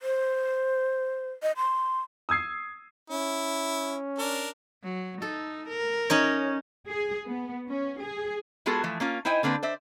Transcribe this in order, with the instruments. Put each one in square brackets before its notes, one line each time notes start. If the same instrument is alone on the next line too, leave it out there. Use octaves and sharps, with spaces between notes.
[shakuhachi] C5
D#5
C6
[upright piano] D#6 E6 G#6 C7
[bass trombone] C#4 [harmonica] E4
[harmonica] D4 A#4
[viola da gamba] F#3
[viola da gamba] D#4 [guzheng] A4
[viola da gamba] A#4
[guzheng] C#4 D#4 C#5
[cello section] G#4
B3
C#4
G#4
[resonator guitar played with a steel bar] G#3 B3 F4 F#4 G#4 A4
E3 F3 A3
A#3 C#4 F4
D#4 E4 C5 D#5 G5 G#5
D3 A#3 C4 D4 B4
C5 D5 E5